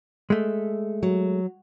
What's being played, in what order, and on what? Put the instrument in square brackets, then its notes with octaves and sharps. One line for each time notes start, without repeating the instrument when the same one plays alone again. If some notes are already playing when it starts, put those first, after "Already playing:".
[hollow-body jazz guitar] G#3 A3
[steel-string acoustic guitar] F#3